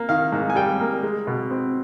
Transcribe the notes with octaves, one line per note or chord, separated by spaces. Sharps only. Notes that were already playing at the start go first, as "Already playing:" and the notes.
Already playing: A#3
D#3 F5
G#2
G#5
G3 G5
A#3
G#3
B2
C4